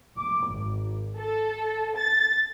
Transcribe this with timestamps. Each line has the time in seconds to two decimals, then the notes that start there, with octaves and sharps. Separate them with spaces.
0.17 D6
0.49 G#1
1.17 A4
1.96 A6